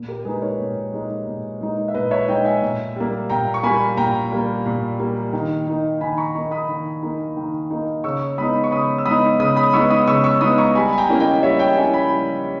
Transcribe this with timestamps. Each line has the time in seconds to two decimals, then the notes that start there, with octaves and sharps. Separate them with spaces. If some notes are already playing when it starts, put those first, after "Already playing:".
Already playing: A#2
0.08 G4 A#4
0.25 G#3 D#4 G#4 B4
0.42 A#4 C#5
0.59 A#2
0.93 G#3 D#4
1.26 A#2
1.61 G#3 D#4
1.88 E5
1.94 A#2 B4 D#5
2.11 C#5 E5
2.28 G#3 D#4 D#5 G5
2.45 E5 G#5
2.62 A#2
2.96 G3 A#3
3.30 A#2 G5 A#5
3.54 C#6
3.63 G3 A#3 G#5 B5
3.97 A#2 G5 A#5
4.32 G3 A#3
4.66 A#2
5.00 G3 A#3
5.33 D#3
5.67 A#3 D#4
6.01 D#3 G#5 B5
6.18 A#5 C#6
6.35 A#3 D#4
6.51 B5 D#6
6.68 D#3
7.03 A#3 D#4
7.37 D#3
7.70 A#3 D#4
8.04 C#3 C#6 E6
8.38 G#3 B3 D#4 B5 D#6
8.64 C#6
8.72 C#3 B5 D#6
8.98 E6
9.05 G#3 B3 D#4 B5 D#6
9.40 C#3 B5 D#6
9.56 B5 D#6
9.73 G#3 B3 D#4 C#6 E6
9.90 B5 D#6
10.07 C#3 C#6 E6
10.24 C#6 E6
10.41 G#3 B3 D#4 B5 D#6
10.58 A#5 C#6
10.75 G3 G#5 B5
10.93 G#5
10.98 G5 A#5
11.09 A#3 C#4 E4
11.20 D#5 G5
11.43 G3 C#5 E5
11.59 D#5 G5
11.77 A#3 C#4 E4 E5 G#5
11.94 G#5 B5
12.10 G3